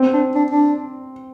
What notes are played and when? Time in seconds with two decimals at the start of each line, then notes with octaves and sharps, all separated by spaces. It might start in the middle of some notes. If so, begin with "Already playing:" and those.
Already playing: C4
0.13 D4
0.35 D4
0.51 D4